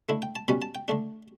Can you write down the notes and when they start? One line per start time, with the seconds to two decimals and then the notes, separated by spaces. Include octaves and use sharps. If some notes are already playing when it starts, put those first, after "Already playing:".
0.09 D3 A3 E4
0.22 G5
0.36 A5
0.48 B2 G3 C#4 B5
0.62 A5
0.75 G5
0.88 D3 A3 D4